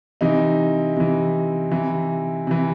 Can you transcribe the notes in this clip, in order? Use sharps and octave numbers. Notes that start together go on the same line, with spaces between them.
C3 E3 D#4
C3 E3
C3 E3
C3 E3